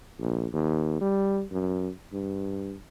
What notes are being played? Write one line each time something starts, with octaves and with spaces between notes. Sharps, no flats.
A#1
D#2
G3
F#2
G2